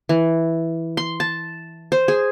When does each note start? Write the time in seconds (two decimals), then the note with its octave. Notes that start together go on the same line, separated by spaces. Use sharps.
0.09 E3
0.97 C6
1.20 A5
1.92 C5
2.08 G#4